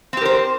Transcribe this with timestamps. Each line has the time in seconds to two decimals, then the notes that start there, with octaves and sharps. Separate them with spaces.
0.13 C4
0.17 G4
0.21 A#4
0.25 C5